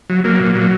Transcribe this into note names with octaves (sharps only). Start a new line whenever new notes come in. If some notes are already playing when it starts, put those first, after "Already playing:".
F#3
F#3 A#3
A#2
F#3